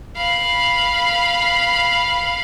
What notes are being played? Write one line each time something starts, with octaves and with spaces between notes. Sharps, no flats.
F5 B5